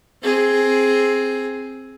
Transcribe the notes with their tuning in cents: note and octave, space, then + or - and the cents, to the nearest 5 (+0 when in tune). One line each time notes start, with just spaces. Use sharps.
C4 +10 G#4 +10